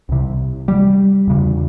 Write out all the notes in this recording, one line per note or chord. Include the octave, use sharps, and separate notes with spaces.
C2 C3
G3
E2 C#3